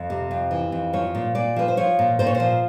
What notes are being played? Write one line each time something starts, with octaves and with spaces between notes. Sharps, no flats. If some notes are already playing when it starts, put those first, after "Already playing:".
Already playing: F2
C3
F2
E3
F2
F3 C#5
A#2
A#2 D5
F3 B4
C5
F3 C#5
A#2
A#2 C5
C#5
C5
F3